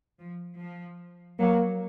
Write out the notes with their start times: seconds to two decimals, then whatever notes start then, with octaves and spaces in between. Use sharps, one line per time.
0.19 F3
0.59 F3
1.39 F#3 A#3